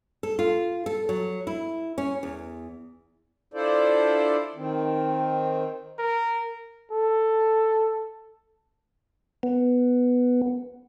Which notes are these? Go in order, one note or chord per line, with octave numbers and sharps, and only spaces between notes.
A4
F4
A4
F#3
E4
C#4
E2
D4 E4 F4 A4 C5 D5
D#3 C4
A#4
A4
B3